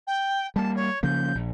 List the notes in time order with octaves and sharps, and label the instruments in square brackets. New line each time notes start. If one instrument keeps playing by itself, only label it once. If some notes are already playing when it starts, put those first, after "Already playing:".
[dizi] G5
[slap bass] G3 A#3 [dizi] A5
[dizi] C#5
[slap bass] C#3 F3 A#3 [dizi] G6
[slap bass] A#1